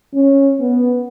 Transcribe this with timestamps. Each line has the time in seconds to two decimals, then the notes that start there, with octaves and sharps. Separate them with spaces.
0.14 C#4
0.61 B3